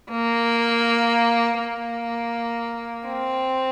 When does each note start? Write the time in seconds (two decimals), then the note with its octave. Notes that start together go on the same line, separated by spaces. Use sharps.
0.11 A#3
1.59 A#3
3.07 C4